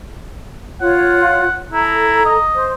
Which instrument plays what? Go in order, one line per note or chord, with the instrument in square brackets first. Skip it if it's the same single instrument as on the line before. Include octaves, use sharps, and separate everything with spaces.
[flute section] F4 C#5 [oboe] F#5
[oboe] E4 [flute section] A4 A#5
[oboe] D#5
[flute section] C5